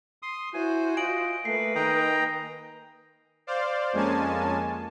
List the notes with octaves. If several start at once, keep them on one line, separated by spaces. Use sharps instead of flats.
C6 D#6
E4 F#4 C5 G#5
F4 D#5 G#5 D7 F#7
A3 A#3 B4 C7
D#3 D#5 G5 A#5
C5 D5 F5
F2 G#3 A#3 C#4 G#5 A5